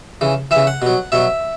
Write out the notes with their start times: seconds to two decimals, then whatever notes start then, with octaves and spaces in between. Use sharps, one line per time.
0.21 C#3 E3
0.51 C#3 E3 E5
0.67 F#5
0.82 B2 F#3
1.12 B2 F#3 E5